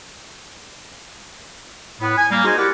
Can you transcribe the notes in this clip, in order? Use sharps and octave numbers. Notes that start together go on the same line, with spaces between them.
A2 B3
G#5
G3 A#3
D#4 F#4 G#4 C5 D#5 G#5
E4 G4 A#4 D5 F#5